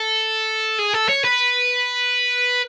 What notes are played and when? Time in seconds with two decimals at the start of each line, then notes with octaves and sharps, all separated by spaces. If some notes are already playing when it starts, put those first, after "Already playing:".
Already playing: A4
0.79 G#4
0.94 A4
1.09 C#5
1.24 B4